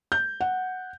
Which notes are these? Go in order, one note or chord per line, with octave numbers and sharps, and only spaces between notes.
G6
F#5